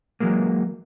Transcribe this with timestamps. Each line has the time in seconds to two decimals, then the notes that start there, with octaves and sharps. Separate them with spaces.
0.20 E3 F#3 G#3 A#3